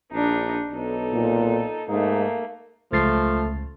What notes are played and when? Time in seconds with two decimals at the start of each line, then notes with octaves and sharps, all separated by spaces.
0.13 A#1 D4 D#4
0.72 B1 D#4 A4
1.13 A#2
1.89 G#2 A3 A#3 D#4
2.93 C#2 F3 A3 A6 C7